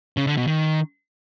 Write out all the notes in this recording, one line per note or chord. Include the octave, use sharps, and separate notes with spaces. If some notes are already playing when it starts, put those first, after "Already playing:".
C#3
D3
B2
D#3